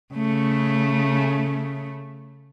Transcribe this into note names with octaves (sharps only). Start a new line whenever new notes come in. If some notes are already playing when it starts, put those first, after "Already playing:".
C#3 A3